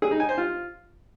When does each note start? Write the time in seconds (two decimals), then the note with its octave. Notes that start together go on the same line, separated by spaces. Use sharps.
0.02 G#4
0.11 D#4
0.20 G#5
0.29 C5
0.38 F4